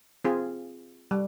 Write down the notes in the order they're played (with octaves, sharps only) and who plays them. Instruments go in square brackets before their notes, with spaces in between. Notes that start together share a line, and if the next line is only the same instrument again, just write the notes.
[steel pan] C4 F4 G#4
G3